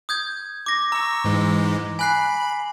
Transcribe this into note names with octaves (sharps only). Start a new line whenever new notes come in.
D#6 G6 G#6
D6 A#6
A#5 C#6 E6
G#2 E3 G#3
G#5 B5 F#6 C7